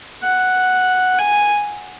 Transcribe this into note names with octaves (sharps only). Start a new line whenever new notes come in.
F#5
G#5